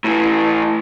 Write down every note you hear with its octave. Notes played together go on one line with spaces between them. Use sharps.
A2 E3